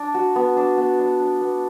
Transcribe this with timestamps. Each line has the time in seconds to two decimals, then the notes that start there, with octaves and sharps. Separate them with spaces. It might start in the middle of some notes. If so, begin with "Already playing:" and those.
Already playing: D4
0.14 F#4
0.36 B3
0.57 D4
0.78 B3
0.99 D4
1.20 D4
1.41 B3